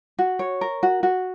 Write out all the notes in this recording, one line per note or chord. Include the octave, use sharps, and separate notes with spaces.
F#4
C#5
A#4
F#4
F#4